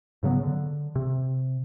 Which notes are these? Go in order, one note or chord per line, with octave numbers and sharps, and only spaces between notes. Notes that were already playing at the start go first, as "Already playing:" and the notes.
G#2 C#3 F#3 B3
D3
C3